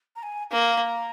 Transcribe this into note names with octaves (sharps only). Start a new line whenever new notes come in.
A#5
G#5
A#3 A#5